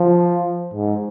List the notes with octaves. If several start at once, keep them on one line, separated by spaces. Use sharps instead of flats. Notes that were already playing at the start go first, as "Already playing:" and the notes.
Already playing: F3
G#2